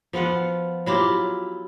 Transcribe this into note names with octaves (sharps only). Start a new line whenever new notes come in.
F3 B3 F4 F#5
F#3 E4 F4 G4